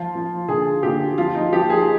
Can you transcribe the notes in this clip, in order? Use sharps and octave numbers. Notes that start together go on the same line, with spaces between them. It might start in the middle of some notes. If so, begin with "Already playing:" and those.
Already playing: F3 F4
F3
D3 G#4
D3 G4
F3 F4
D#4
F3 G4
G#4